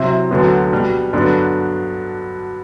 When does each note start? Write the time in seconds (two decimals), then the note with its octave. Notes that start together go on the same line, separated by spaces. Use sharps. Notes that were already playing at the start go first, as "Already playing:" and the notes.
Already playing: C3 F#3 C4 E4
0.31 D2 D3 F#3 B3
0.71 B2 G3 D4
1.13 G2 D3 F#3 B3 D4